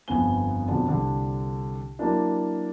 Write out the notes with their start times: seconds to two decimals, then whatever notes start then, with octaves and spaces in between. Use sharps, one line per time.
0.08 G1 F2 B3 G#5 G7
0.68 F2 B2 D3
0.88 C2 D3
1.99 F#3 A#3 D4 E4